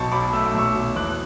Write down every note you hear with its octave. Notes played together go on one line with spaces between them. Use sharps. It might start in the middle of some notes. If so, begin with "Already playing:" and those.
Already playing: B1 B2 A5 C#6
B1 B5 D6
A3 E6
D6
B1 C#6 E6
B2
E2 D6 F#6